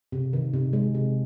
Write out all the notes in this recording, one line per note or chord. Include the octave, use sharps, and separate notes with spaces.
C3
D#3
C3
G#3
C3